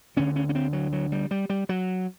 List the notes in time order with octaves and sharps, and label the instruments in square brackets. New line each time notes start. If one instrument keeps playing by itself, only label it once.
[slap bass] D2 D3 C#4
C#4
C#4
C4
F#3
F#3
G3
G3
G3
F#3